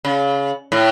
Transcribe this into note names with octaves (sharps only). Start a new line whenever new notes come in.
C#3
A2